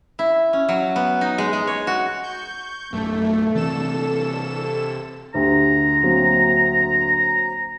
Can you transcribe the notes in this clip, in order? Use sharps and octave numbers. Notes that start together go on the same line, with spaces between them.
E4
C#4
F#3
B3
D#4
G#3
G#3
C#5
F#4
C#6 G6
A#1 F#2 A3
C3 E3 C4 A4 E7
D2 G4 A#5
F#3 A#3 C4